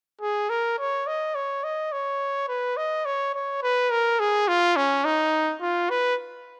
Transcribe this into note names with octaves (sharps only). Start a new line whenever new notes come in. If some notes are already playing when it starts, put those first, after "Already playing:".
G#4
A#4
C#5
D#5
C#5
D#5
C#5
B4
D#5
C#5
C#5
B4
A#4
G#4
F4
C#4
D#4
F4
B4